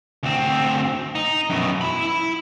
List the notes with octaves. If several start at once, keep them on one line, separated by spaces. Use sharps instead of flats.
D2 C4
D#4
F#2 B2
E4 B5